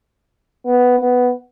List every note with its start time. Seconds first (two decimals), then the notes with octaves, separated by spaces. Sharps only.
0.65 B3
0.99 B3